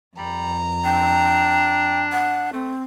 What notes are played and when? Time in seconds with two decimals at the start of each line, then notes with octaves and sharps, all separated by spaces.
0.18 F2 G3 A#5
0.85 D4 G5
2.12 F#5
2.53 A3 C4